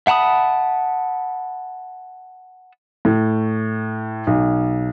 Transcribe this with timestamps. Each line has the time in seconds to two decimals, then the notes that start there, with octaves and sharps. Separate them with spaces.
0.07 E5 F#5 A5 B5 D#6
3.05 A2
4.27 B1